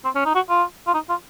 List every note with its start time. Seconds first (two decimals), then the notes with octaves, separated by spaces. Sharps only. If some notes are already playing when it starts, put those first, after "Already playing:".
0.04 C4
0.15 C#4
0.25 D#4
0.35 F#4
0.49 F4
0.87 F4
0.94 D#4
1.09 F4